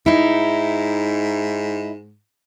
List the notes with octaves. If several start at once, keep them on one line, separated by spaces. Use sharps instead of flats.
G#2 D#4 E4